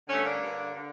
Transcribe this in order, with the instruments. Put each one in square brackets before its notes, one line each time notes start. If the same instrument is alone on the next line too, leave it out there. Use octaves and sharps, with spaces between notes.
[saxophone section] G2 D3 A3 C#4
A#3 D4
G2 D3
D3